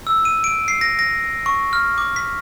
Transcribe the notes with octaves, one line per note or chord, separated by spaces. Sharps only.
E6
D#7
D7
C7
A#6
A#6
C#6
F6
D6
B6